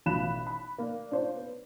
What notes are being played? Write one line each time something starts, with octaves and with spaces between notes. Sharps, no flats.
A1 B2 F4 B5 F#6 E7
B5
A#3 D5
D4 F4 C5 C#5
B3